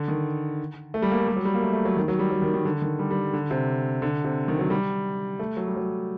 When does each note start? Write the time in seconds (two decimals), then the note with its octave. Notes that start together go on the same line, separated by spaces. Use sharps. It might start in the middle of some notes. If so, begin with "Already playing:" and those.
Already playing: D3
0.08 D#3
0.94 A3
1.02 G3
1.11 A#3
1.20 A3
1.28 G3
1.37 F#3
1.45 G3
1.54 A#3
1.62 A3
1.73 A3
1.85 F#3
1.96 D#3
2.08 F#3
2.19 G3
2.32 F#3
2.42 D#3
2.54 D#3
2.65 D3
2.82 D#3
2.99 G3
3.11 G3
3.34 D3
3.51 C3
4.02 D3
4.24 C3
4.48 D#3
4.59 F#3
4.70 G3
5.39 A3
5.57 F#3
5.67 G3
5.77 F#3